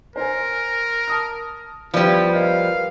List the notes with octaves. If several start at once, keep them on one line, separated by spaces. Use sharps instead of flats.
A#4 C5 G#5
A5 D#6 F6
F3 G3 B3 E4 B4 D5
A#4 B4 D#5 F5